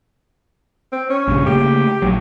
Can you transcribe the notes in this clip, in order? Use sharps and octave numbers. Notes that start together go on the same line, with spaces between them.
C4
C#4
A#1 G2 C#3
C#3 A3 A#3 G4
A#1 F#3